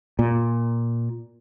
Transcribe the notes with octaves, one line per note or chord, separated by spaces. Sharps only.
A#2